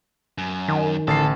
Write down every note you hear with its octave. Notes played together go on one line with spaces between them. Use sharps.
F#2
D#3
A1 D3 A4 A5 C7